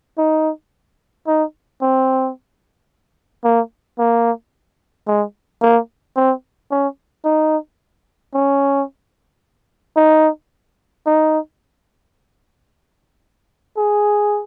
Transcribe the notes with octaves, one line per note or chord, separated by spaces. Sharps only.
D#4
D#4
C4
A#3
A#3
G#3
A#3
C4
C#4
D#4
C#4
D#4
D#4
G#4